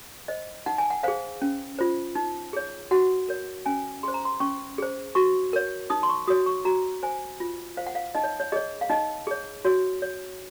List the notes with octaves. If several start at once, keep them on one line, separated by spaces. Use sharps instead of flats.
C5 D#5
D#4 F#5
G#5
F#5
G#4 C5 F5
C#4
F4 C5
D#4
G#4 C#5
F#4 F#5
A#4 C#5
C#4 G#5
G#4 C5 C6
A#5
C6
C#4 C#6
G#4 C5
F#4 C#6
A#4 C#5
D#4 D#6
C6
C#6
F#4 C#5 D#6
C#6
F#4 A#5
C5 G#5
F4
C5 F5
F#5
F5
D#4 D#5
C#5
C#5
G#4 C#5 D#5
F5
D#4 D#5
G#4 C#5
F#4 C#5
C#5